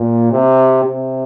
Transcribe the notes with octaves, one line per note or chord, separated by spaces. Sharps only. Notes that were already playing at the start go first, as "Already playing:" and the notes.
Already playing: A#2
C3
C3